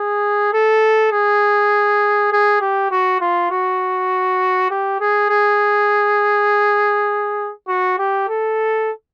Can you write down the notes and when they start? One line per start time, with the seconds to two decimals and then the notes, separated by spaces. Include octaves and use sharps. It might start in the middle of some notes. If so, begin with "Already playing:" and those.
Already playing: G#4
0.53 A4
1.12 G#4
2.32 G#4
2.61 G4
2.91 F#4
3.20 F4
3.51 F#4
4.70 G4
5.00 G#4
5.29 G#4
7.68 F#4
7.98 G4
8.28 A4